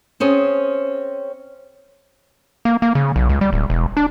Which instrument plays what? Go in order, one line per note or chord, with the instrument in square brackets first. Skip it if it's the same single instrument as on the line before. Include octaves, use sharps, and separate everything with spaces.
[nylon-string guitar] C4 C#4 G#4 C5 D#5
[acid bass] A#3
A#3
C#3
B1
C#2
G3
D1
E1
D4